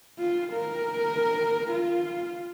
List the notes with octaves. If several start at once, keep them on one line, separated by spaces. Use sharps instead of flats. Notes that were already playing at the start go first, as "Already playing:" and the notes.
F4
A#4
F4